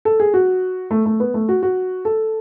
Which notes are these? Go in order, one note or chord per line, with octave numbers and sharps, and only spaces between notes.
A4
G#4
F#4
A3
A3
B3
A3
F#4
F#4
A4